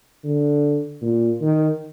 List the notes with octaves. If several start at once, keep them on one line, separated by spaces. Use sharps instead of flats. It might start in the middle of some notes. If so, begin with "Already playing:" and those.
D3
A#2
D#3